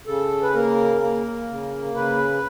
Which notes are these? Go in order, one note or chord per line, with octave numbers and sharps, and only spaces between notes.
C#3 A4
B4
A#3 A#4
A#3
C#3
C#3 B4